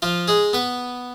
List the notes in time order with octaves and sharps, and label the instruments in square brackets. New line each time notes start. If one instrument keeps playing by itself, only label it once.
[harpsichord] F3 F4
G#3 G#4
B3 B4